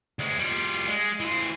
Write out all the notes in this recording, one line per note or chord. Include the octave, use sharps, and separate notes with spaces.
D2 G#3
G3 F4
G#3
E3 C5